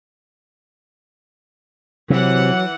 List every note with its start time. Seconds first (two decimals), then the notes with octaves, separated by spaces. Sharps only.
2.10 C3 E3 F#3 F#5